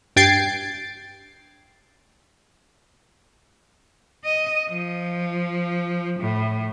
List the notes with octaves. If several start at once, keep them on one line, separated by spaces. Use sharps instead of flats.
G2 G5 G#6 A6 C7 D7
D#5
F3
A2